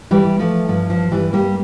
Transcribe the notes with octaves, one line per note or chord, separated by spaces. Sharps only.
E3 G3
E3
F3 A3
G2 F3
F3
G2 E3 G3
G3 A#3